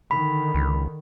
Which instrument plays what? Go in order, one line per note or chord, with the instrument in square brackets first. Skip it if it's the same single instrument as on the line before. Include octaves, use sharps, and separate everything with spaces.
[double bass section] D3 D#3 [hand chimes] B5
[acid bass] C#2